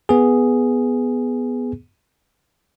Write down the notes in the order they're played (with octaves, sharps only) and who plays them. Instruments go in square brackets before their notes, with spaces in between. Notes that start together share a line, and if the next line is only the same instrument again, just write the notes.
[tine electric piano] B3 G#4